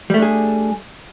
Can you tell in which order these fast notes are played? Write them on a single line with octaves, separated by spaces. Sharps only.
G3 A3 D4 G#4